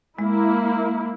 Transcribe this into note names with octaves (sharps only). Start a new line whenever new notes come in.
G#3 A#3 E4